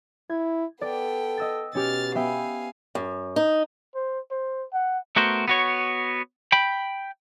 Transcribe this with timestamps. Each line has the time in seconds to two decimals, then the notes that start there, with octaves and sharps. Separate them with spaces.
0.30 E4 G#6
0.81 B3 A4 D5 G5
1.37 D#5 E6 A6
1.75 B2 C#4 G4 F6 A6
2.15 B3 E5 F5 G5 G#5
2.95 F#2
3.36 D#4
3.95 C5
4.31 C5
4.73 F#5
5.16 A3 B3 F#4 A#4 C5
5.48 B3 F#4 C#5
6.52 G5 B5